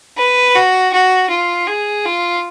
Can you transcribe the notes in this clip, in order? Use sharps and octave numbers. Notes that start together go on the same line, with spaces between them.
B4
F#4
F#4
F4
G#4
F4